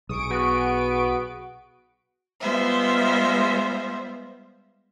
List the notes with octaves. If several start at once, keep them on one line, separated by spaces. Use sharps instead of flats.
B1 G#4 C#6 D#6 D7
B3 F#4
G3 G#3 B3 F4 C5 E5